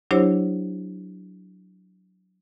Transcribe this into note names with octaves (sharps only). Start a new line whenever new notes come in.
F#3 D4 E4 G4 C5 C#5